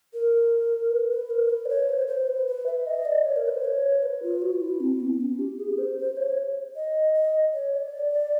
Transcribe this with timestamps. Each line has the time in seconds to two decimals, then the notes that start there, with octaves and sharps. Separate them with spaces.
0.14 A#4
0.91 B4
1.10 B4
1.30 A#4
1.50 B4
1.66 D5
1.69 C#5
1.89 C5
2.08 C5
2.27 B4
2.47 B4
2.66 E5
2.87 D#5
3.05 D5
3.25 C#5
3.36 A#4
3.45 B4
3.54 C5
3.64 C#5
4.03 B4
4.23 F4
4.42 F#4
4.61 E4
4.80 C4
5.00 B3
5.20 C#4
5.39 G4
5.59 G#4
5.78 C5
5.98 C5
6.17 C#5
6.76 D#5
7.15 D#5
7.54 C#5
7.73 D5